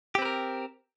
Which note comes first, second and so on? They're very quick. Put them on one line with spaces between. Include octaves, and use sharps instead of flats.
G4 C4 B4 A#4